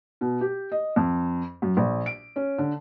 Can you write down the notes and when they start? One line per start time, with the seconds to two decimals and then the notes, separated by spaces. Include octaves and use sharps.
0.21 B2
0.41 G4
0.72 D#5
0.96 F2
1.62 F#2
1.77 A#1
2.06 D7
2.36 C#4
2.58 D3